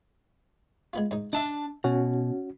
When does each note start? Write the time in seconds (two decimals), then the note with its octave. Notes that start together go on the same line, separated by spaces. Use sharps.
0.93 G#3 B3 F4
1.11 G#2 D#4
1.33 D4 D#4 E5 A5
1.84 B2 C#4 F#4